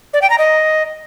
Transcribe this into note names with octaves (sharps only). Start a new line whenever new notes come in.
D5
G5
A#5
D#5